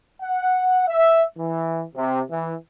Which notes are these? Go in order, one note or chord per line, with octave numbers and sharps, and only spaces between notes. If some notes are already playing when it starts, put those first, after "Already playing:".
F#5
E5
E3
C3
E3